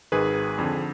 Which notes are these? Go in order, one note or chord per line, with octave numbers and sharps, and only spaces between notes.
G#1 G#2 D#3 G#4 B4
F2 D3